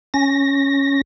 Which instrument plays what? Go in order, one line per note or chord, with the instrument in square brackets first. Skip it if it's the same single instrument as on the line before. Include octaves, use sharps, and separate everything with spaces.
[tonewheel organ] C#4 A#6